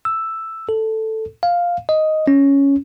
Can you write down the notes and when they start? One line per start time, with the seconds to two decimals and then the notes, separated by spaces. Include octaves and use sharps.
0.05 E6
0.69 A4
1.43 F5
1.89 D#5
2.28 C#4